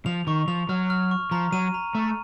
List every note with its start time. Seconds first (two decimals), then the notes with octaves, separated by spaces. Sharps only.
0.06 F3 F7
0.27 D#3 C#6
0.48 F3 F7
0.69 F#3 F6
0.90 F6
1.11 C#6
1.31 F3 A#5
1.52 F#3 D#7
1.74 A#5
1.94 A3 A#5